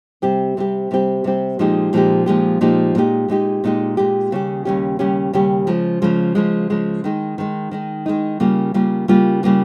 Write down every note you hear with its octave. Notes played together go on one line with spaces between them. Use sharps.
C3 G3 C4 G4
C3 G3 C4 G4
C3 G3 C4 G4
C3 G3 C4 G4
A#2 F3 G#3 D#4 G4
A#2 F3 G#3 D#4 G4
A#2 F3 G#3 D#4 G4
A#2 F3 G#3 D#4 G4
A#2 G#3 D#4 G4
A#2 G#3 D#4 G4
A#2 G#3 D#4 G4
A#2 G#3 D#4 G4
D#2 C#3 G3 C#4 G4
D#2 C#3 G3 C#4 G4
D#2 C#3 G3 C#4 G4
D#2 C#3 G3 C#4 G4
C#3 F3 G#3
C#3 F3 G#3
C#3 F3 G#3
C#3 F3 G#3
D#3 G#3 D#4
D#3 G#3 D#4
D#3 G#3 D#4
D#3 G#3 D#4
C#3 G3 A#3 F4
C#3 G3 A#3 F4
C#3 G3 A#3 F4
C#3 G3 A#3 F4